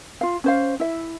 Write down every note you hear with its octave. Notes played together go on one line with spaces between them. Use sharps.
F4 F5
C#4 C5 F5
E4 E5